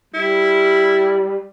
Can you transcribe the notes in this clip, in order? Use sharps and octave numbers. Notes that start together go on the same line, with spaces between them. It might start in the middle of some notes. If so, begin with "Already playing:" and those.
G3 E4